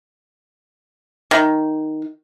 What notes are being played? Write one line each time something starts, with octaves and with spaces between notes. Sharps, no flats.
D#3